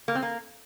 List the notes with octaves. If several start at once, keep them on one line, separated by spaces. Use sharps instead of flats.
A#3
C4
A#3